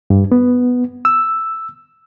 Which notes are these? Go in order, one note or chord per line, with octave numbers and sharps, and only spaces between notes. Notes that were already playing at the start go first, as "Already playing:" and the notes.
G2
B3
E6